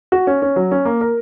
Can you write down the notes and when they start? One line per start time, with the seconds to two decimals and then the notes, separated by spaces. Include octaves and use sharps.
0.12 F#4
0.27 C#4
0.42 C#4
0.56 F#3
0.71 C#4
0.85 A#3
1.01 A#4